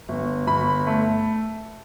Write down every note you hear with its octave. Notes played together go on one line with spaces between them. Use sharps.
G1
G1 B5
A3